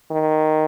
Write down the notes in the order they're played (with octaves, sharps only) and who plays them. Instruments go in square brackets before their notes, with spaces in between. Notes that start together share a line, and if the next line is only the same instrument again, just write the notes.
[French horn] D#3